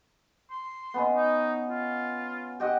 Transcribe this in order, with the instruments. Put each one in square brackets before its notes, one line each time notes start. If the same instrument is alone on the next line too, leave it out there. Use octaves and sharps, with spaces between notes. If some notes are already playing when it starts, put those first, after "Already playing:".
[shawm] C6
[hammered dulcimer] B3 C#4 D#5
[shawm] D#4
F4
[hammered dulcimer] G4 D#5 F#5